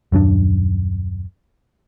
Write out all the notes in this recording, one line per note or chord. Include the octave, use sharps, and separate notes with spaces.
D#1 F#2 C#4 D4